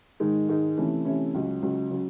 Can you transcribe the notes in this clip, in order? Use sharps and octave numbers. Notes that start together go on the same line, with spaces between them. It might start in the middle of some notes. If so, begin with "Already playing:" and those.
G#2 D#3 G#3 D#4
G#2 D#3 G#3 D#4
C3 E3 A3 C#4 E4
C3 E3 A3 C#4 E4
C#2 C#3 F#3
C#2 C#3 F#3
C#3 F#3